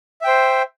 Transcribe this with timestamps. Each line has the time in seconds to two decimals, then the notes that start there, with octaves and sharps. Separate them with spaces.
0.22 E5
0.24 G5
0.27 C5